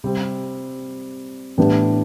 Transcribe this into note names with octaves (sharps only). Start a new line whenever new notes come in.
C3 G3 C4
A2 E3 B3 D4 G4